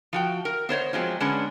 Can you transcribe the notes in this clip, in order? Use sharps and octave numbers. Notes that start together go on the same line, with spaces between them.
F3 F#4 G5
A#4
B3 C5 C#5 D#5
F3 F#3 G#3 C4
D3 G#3 B3 C#4 D4